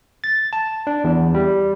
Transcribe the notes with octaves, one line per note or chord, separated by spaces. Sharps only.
A6
A5
D4
E2
G3